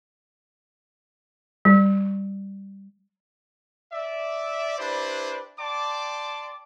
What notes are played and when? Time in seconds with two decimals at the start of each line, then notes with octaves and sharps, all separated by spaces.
1.65 G3
3.92 D5 E5
4.78 D4 E4 G4 B4 C5 D5
5.58 D5 G5 A5 C6 D6